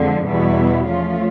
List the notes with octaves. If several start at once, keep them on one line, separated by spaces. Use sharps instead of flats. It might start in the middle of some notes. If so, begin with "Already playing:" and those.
Already playing: F2 D3 F3 G#3
E2 B2 G3 B3 E4
F3 A3 C#4 F4